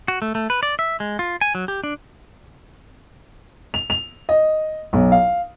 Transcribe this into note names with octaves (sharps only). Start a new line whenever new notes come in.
F#4
A3
A3
B4
D5
E5
G#3
F4
G#5
F#3
G4
D4
F7
F7
D#5
B1
F5